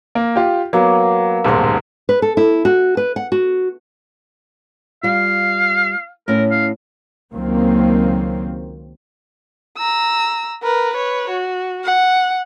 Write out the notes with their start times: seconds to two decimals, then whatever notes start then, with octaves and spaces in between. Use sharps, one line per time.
0.15 A#3
0.36 F4 G4
0.73 F#3 A#3 B3 C#5
1.44 D#1 B1 G#2 C5 D5
2.09 B4
2.22 A4
2.37 E4
2.65 F#4
2.97 B4
3.16 F#5
3.32 F#4
5.03 G3 F4 F5
6.28 A2 C#4 A#4
6.51 F5
7.32 C#2 D#3 F#3 A#3 C4
9.78 A#5 E6
10.63 A#4 B4
10.93 B4 C#5
11.30 F#4
11.85 F#5